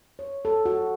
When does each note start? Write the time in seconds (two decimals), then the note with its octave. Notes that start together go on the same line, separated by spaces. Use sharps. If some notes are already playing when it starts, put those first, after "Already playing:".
0.19 C#5
0.45 A4
0.66 F#4